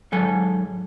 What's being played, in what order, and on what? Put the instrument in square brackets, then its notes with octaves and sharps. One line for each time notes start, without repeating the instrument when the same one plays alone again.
[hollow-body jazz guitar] G#2 F#3 A4 G#5